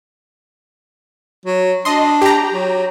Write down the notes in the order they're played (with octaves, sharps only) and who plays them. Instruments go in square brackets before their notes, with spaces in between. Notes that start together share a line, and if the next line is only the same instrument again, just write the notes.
[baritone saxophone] F#3
[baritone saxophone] D4 [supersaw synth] D#5 C6
[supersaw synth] G4 A#5
[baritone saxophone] F#3